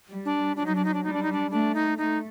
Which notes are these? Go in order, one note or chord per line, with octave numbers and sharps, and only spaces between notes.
G3
D4
F#3 D4
D#4
D4
D#4
D4
G3 D#4
D4
D#4
D4
A3 D4
D#4
A3 D#4